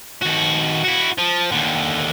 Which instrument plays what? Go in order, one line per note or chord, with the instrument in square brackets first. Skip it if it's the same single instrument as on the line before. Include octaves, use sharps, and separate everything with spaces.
[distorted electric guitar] D#2 F#4
E4 F#4
F3
D#2 D3